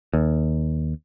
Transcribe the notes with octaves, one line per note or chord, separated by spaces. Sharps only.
D#2